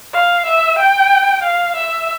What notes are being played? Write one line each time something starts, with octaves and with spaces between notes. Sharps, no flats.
F5
E5
G5
F5
E5